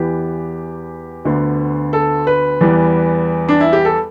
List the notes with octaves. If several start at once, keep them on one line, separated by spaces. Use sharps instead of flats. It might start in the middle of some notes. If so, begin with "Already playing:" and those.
Already playing: E2 E3 B3 G4
D2 D3 B3
A4
B4
E2 E3 G3 B3
D4
E4
G4
A4